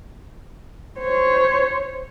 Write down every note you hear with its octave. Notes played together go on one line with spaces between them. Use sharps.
C5 C#5